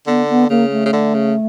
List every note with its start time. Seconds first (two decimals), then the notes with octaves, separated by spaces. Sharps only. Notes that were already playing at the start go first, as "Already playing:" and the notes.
0.07 D3 B3
0.29 B3
0.50 C#3 A#3
0.71 A3
0.86 C#3
0.93 D3
1.14 C#3